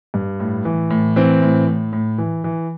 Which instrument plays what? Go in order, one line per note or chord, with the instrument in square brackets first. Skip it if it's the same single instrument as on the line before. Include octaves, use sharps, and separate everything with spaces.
[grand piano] G2
A2
E3
A2
E3 C4
A2
A2
A2
E3
E3